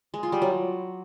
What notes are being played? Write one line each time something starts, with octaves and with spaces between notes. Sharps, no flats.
G#3
F4
G3
F#3